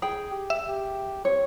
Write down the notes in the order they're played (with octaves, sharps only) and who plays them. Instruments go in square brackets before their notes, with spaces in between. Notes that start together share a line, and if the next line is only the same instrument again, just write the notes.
[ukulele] G#4 G5
[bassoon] G4
[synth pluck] E5
[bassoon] G4
[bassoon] C4 [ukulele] C#5